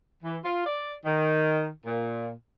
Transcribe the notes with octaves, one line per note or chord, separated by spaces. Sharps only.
E3
F4
D5
D#3
A#2